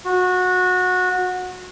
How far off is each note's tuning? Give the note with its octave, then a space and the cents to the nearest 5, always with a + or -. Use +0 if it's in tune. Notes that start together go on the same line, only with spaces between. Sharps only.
F#4 -20